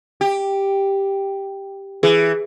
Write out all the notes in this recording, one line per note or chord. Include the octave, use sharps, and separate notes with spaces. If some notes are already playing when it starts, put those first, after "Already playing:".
G4
E3 G#4